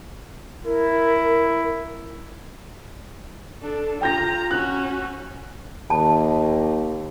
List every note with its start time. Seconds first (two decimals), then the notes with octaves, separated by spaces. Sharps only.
0.65 E4 A#4
3.61 D4 A4
4.01 F4 G5 A#5 G6 A#6
4.51 C#4 F#4 F#6
5.90 D#2 A5